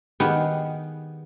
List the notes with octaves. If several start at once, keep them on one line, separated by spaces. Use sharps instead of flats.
D#3 G3 B3 G4 G#4 B4